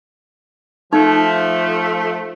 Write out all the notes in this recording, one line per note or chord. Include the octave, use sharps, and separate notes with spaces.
F3 A3 D#4